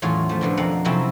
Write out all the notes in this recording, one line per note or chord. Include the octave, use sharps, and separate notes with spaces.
E2 A2 F#3 C#4 F4 G#4
F3 A3
B2 D3 F3
F2 A#3 F5 F#5
C3 F3 F#3 C4 C#4 E4